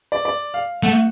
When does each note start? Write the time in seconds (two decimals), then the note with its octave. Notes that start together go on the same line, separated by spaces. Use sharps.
0.12 D5
0.25 D5
0.54 F5
0.83 A3 F#5